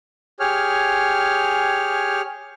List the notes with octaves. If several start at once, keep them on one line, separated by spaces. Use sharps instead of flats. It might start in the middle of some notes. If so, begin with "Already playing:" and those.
G4 G#4 C#5 F6